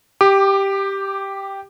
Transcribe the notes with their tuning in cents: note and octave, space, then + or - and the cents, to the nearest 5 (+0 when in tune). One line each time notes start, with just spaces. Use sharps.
G4 +0 D6 +25